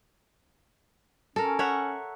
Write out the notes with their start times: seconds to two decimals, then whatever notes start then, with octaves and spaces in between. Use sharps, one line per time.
1.36 C#4 A4 A#4
1.59 C#5 E5 F#5